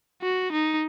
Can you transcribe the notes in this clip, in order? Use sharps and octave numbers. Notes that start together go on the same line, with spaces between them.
F#4
D#4